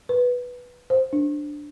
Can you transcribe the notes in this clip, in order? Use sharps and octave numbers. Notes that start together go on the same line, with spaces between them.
B4
C5
D4